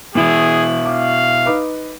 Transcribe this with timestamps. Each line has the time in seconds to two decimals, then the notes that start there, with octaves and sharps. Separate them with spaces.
0.15 B2 E3 E4 G#4
0.85 F5 D6
1.46 D#4 B4 D6